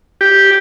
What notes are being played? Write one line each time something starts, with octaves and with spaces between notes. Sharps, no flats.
G4